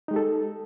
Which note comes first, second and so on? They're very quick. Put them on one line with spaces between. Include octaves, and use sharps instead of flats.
D#4 G#3 G4 A4